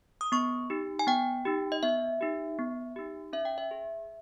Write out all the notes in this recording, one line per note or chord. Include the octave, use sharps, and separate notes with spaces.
D#6
B3 C#6
D#4 G4
G#5
B3 G5
D#4 G4
D#5
B3 E5
D#4 G4
B3
D#4 G4
C#4 E5
G5
E5
G#4